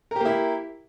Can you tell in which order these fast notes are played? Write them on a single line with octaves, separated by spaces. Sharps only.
A#4 G4 A#3 E4